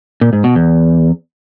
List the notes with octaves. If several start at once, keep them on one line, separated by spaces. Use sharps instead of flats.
A#2
G#2
B2
E2